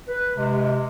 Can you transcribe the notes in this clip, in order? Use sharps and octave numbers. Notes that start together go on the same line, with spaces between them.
B4
C3 G#3